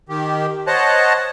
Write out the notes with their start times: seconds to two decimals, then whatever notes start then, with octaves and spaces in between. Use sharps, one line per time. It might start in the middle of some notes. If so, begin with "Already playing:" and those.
0.09 D#3 G4
0.67 C5 C#5 D#5 F#5 A5 F#6